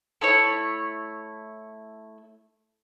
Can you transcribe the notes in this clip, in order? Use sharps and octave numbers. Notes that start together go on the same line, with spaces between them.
A3 E4 C#5